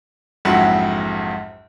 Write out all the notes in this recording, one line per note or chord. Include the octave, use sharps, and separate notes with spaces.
A#1 F2 G#2 F#3 E4 F#5